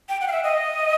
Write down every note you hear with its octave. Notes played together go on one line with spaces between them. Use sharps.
G5
F#5
F5
E5
D#5